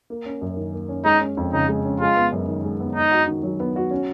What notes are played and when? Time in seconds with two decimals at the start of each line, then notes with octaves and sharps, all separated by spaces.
0.10 A#3
0.26 C#4
0.42 F#2
0.57 D#3
0.73 A#3
0.89 C#4
1.05 G#3 D#4
1.21 C#4
1.37 F2
1.53 C#3 D#4
1.69 G#3
1.85 C#4
2.00 G#3 F4
2.16 B3
2.32 F#2
2.48 D#3
2.65 G#3
2.80 B3
2.95 B3 D#4
3.11 F#4
3.28 D#3
3.43 F#3
3.60 B3
3.76 F#4
3.91 C#4